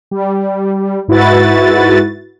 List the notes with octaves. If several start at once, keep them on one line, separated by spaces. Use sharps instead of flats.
G3
G#2 E4 F#4 B4 A6